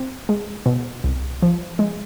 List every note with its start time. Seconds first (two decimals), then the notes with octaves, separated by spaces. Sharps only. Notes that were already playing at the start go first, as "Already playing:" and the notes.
Already playing: C4
0.29 G#3
0.66 B2
1.04 C2
1.42 F3
1.79 G#3